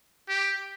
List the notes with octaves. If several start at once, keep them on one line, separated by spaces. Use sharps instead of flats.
G4